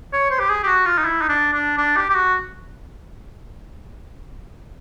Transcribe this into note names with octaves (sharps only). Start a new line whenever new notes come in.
C#5
C5
G4
G#4
G4
F#4
F4
D#4
E4
D#4
D4
D4
D4
G4
G4
F#4